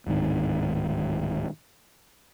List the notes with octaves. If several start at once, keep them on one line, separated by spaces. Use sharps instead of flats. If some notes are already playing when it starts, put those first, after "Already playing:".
D1 G#2 D#3